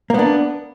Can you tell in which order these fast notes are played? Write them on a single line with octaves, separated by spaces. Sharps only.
A#3 B3 D4